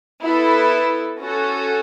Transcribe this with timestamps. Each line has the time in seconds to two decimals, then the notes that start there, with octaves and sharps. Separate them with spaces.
0.23 B3 E4 A4
1.19 C#4 F#4 A4